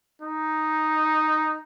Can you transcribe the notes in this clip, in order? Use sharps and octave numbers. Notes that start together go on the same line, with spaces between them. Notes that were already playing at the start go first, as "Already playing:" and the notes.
D#4